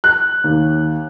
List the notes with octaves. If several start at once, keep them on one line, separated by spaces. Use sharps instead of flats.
F#6
D#2